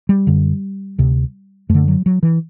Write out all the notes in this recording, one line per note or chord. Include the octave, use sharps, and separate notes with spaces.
G3
F#2 D3
D2 C3
F#2 D3 A3
F#3
F#3
E3